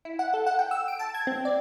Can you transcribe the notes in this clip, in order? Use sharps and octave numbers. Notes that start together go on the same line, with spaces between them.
E4
F#5
A4
F#5
G5
E6
D7
A5
G#6
C4
D5